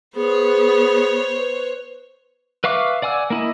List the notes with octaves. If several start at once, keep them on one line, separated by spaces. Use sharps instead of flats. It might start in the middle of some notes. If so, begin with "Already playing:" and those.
B3 G#4 C5 C#5
B4
B4 E5 F5 C#6 D6
D5 F#5 G#5 D6 E6
A#3 E4 D#5